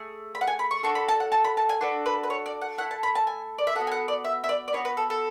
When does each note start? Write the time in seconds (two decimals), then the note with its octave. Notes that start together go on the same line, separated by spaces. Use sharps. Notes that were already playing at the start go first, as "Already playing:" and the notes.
Already playing: A3 G#4
0.35 B5
0.41 F#5
0.47 G#5
0.59 B5
0.71 C#6
0.83 D4 F#4 A4 C#6
0.95 B5
1.08 A5
1.20 F#5
1.32 A5
1.44 B5
1.57 A5
1.69 G#5
1.81 D4 F#4 A4 B4
2.06 B4
2.23 B4
2.30 C#5
2.46 D5
2.61 F#5
2.78 A3 E4 A4 F#5
2.91 A5
3.03 B5
3.15 A5
3.27 G#5
3.58 D5
3.67 E5
3.75 A4 F#5
3.78 B3 F#4
3.87 G#5
3.92 F#5
4.08 D5
4.25 E5
4.44 E5
4.49 D5
4.68 D5
4.73 B3 D4 F#4 C#5
4.85 B4
4.97 A4
5.10 A4